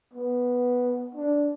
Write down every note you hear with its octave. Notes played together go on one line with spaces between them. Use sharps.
B3
D4